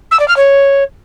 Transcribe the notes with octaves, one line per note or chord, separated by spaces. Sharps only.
E6
D5
F6
C#5